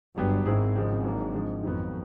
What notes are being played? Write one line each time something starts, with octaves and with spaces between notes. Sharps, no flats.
G1 G2 D3 F#3 B3 D4 G4
G#1 G#2 D#3 G#3 C4 E4 G#4
C#3 F3 G#3 C4
F#3 A#3 D4
D3 F3 G#3
F2 D#3 F#3 B3